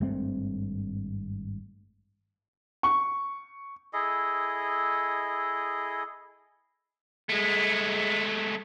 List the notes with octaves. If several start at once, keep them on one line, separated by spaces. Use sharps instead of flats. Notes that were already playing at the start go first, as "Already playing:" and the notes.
G#1 G2 A3 C4
C#6
E4 G#4 A4 D#5
G#3 A3